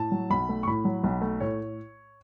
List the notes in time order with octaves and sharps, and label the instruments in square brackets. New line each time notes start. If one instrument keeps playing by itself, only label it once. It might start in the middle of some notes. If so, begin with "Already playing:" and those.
Already playing: [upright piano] A2 A5
F#3
B1 B5
A3
C#6
A2 B5
F#3
B1
A3
A2 C#5